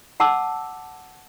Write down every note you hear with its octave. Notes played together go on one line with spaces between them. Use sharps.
F#5 A5 D6 E6